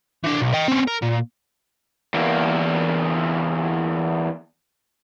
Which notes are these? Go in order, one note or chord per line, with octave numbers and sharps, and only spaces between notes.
E3 D4
B1
D#5 G5
C4 C#4
A#4
A#2
E2 A#3